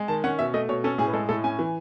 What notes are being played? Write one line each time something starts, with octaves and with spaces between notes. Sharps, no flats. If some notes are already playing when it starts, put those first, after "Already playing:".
Already playing: G#3
D#3 A5
C#4 F#5
B2 E5
A3 D#5
B2 C#5
C#4 A4
A2 G#4
B4
G#3 A4
A2 A4
C#4 G#5
E3